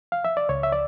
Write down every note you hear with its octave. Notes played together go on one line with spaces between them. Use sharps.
F5
E5
D5
C#2 C#5
E5
D5